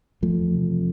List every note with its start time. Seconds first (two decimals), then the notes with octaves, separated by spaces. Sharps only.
0.22 E2 F3 A3
0.38 E2
0.54 C3
0.70 C3